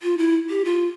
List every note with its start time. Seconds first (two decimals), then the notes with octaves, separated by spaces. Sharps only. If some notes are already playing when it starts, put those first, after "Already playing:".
0.03 F4
0.18 E4
0.50 G4
0.65 F4